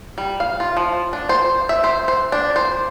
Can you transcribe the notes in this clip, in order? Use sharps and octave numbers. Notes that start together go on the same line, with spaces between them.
G3
F5
F4
F3
D4
C5
E5
C5
C5
D4
C5